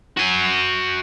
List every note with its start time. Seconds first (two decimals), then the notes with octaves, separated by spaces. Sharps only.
0.17 F#4 G#5